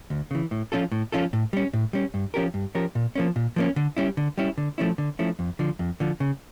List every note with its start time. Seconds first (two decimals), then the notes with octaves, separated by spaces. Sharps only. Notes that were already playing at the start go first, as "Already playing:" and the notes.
0.10 D2
0.31 C#3 E3
0.51 A2
0.72 F3 C#4 F4 A4
0.92 A2
1.12 F3 C#4 F4 A4
1.33 A2
1.53 G3 C#4
1.73 A2
1.93 G3 C#4
2.14 G2
2.34 F3 C#4 G4 A#4
2.54 G2
2.75 F3 C#4 G4 A#4
2.95 A#2
3.16 F3 A#3 C#4
3.36 A#2
3.56 F3 A#3 C#4
3.76 D3
3.97 G3 C#4 E4
4.17 D3
4.38 G3 C#4 E4
4.58 D3
4.78 F3 A3 C#4 E4
4.98 D3
5.19 F3 A3 C#4 E4
5.39 F2
5.59 D3 F3
5.79 F2
6.00 D3 F3
6.20 C#3